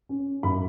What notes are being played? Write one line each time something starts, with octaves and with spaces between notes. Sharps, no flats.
C#4
F#2 B5